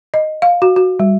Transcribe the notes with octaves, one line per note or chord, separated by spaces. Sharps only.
D#5
F5
F#4
F#4
G3